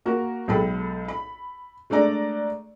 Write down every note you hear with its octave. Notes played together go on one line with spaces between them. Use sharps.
A#3 F#4 A#4
B1 G#3 A4 G5 B5
B5
G#3 A3 D4 D5 A#5